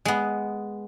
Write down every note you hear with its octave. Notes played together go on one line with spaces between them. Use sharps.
G#3 B3